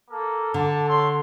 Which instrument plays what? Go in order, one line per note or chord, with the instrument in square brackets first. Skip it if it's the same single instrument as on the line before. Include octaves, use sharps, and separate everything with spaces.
[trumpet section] A#3 A4
[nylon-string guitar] D3 [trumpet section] D4 A5
[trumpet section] A4 C#5 C6